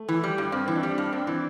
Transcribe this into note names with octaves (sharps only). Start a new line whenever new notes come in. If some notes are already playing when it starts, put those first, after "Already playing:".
Already playing: A3
E3
G3
G2
G2 C4
E3 C4
D4
G3
G2 D4
G2 C4
E3 D4